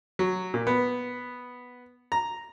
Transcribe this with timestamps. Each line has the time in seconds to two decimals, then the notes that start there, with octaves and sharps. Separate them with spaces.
0.19 F#3
0.54 A#2
0.67 B3
2.12 A#5